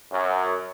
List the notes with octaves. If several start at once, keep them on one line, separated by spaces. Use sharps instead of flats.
F#2